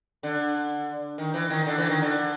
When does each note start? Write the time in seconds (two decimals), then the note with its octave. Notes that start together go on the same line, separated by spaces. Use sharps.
0.23 D3
1.18 D#3
1.34 E3
1.50 D#3
1.66 D3
1.78 E3
1.89 D#3
2.02 D3